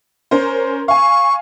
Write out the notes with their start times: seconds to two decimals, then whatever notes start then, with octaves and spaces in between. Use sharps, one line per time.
0.31 C#4 A#4 C5
0.88 F5 G#5 C#6